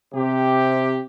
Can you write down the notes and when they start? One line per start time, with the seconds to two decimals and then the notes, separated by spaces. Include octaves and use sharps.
0.15 C3 G4